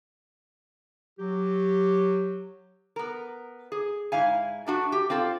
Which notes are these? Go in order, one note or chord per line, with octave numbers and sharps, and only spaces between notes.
F#3 G4
B3 A#4
G#4
G#2 E4 F5 G#5
A3 D4 F#4
G4
C4 F4 A4